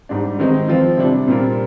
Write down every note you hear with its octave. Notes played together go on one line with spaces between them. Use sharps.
G#2 G3 D4
D#3 G#3 C4 D#4
F3 C4 F4
C3 G3 D4
A#2 G3 C4 F4 A#4